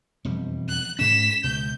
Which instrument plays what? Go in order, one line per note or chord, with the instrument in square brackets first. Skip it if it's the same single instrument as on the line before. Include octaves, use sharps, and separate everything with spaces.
[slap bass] E1 F2 G3
[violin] F#6
[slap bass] G#2 C#4 [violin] B6 E7
[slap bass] C#2 B2 [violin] G6